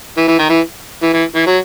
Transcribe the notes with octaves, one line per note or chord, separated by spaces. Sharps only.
E3
E3
D#3
E3
E3
E3
E3
F#3